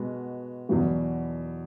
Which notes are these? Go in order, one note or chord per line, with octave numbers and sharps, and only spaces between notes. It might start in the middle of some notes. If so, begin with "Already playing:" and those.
Already playing: B2 G#3 B3 F#4
E2 B2 F#3 B3 F#4